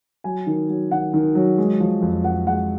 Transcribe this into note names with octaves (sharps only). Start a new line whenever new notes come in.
F#3 G#5
D#3
F#3
D#3 F#5
D#3
F#3
G#3
F3
F2
F2 F#5
G#3 F#5